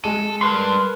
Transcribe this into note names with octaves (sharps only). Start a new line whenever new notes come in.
G#3 A4 D#7
G2 A#4 B4 C6